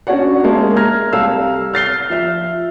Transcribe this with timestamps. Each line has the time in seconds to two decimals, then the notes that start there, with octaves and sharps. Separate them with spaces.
0.07 C#4 D4 F#4 C#5 D5 F#5
0.43 G#3 A#3 E5 A5
0.76 A#5 F6 G#6 A#6
1.13 C2 A4 F5 E6
1.74 F6 A6 C7 G7
2.10 F3 E5 F6